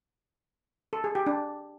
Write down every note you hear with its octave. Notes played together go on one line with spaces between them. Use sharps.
A4
G#4
G4
D4